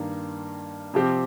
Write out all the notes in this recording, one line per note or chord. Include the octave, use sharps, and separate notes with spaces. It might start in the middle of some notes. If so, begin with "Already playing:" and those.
Already playing: G2 D#3 A#3
C3 F3 C4 G4